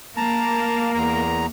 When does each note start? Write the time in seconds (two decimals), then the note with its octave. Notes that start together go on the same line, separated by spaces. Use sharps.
0.17 A#3 A5 A#5
0.94 E2 A#5